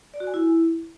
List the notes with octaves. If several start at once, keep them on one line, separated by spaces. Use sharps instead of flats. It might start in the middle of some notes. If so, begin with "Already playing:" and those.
D5
F#4
G#5
E4